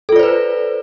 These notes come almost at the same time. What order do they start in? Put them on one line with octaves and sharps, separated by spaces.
A4 F4 D5 C5 B4